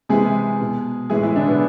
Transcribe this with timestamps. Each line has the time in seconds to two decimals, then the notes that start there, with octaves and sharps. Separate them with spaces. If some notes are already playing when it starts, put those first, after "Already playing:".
0.09 C3 E3 G#3 G#4
0.61 B2
1.10 A2 E3 G#3 G#4
1.23 E3 E4
1.36 D3 D4
1.47 B2 B3